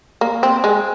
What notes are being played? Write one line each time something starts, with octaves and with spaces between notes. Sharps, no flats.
A#3
C4
G#3